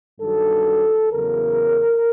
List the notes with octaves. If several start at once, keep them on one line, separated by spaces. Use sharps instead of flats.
G2 D#3 F#3 A4
E2 C#3 F#3 A#4